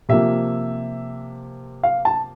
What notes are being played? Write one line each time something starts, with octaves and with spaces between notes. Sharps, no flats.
C3 F3 A#3 E5
F5
A5